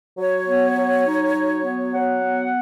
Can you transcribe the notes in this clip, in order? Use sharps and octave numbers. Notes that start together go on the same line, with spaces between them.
F#3 C#5
B3
F#3
D#4
F#3
B3
F#3 F#5
B3